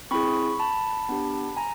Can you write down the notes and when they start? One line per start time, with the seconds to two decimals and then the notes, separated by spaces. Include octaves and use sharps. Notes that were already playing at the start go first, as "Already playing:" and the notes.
0.11 C4 E4 G#4 B5 C#6
0.59 A5 B5
1.09 B3 D4 G4
1.57 G#5 A#5